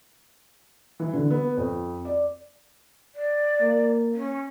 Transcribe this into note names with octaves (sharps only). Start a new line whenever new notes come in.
E3
D3
B3
F2
D5
D5
A#3
C#4